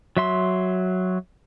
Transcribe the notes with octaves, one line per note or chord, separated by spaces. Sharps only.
F#3 E5 C6